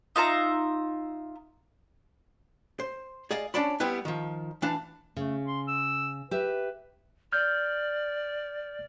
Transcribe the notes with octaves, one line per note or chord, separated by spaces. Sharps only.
D#4 F4 E5 A#5
C5
G#4 D5 D#5 F5
C#4 D4 C#5 D5 A5 B5
G3 B3 C4 E4 B4
D#3 F3
E3 D4 F5 A5
C#3 A3
C6
E6
G4 B4 E5
D5 F6 G6